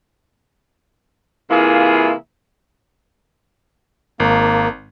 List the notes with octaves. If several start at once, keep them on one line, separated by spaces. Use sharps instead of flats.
C3 E3 A#3 E4 F4 G#4
G#1 A#3